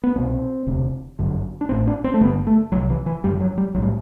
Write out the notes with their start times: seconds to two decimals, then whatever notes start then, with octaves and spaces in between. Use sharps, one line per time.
0.03 B3
0.16 C2 B2 C4
0.67 E1 D2 C3
1.19 G1 F#2 D3
1.61 D4
1.69 A1 A2 C4
1.87 D4
2.04 C4
2.14 A3
2.20 G1 G2 D3 B3
2.47 A3
2.72 C2 C3 F#3
2.90 E3
3.06 E3
3.23 F#1 F#2 D3 G3
3.40 F#3
3.58 G3
3.74 B1 F#3
3.78 A2 G3